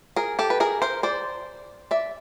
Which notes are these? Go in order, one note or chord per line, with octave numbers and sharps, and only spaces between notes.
G#4 A#4
G4 A4
B4
G#4 A#4
A#4 C5
C5 D5
D5 E5